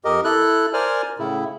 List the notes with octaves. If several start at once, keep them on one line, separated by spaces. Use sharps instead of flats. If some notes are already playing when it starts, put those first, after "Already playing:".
F2 G4 A#4 D#5
E4 A4 F#6
A#4 C5 D5 G#5 F6
A2 C#3 E4